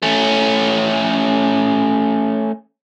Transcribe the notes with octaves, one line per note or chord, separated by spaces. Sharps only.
A3 C#4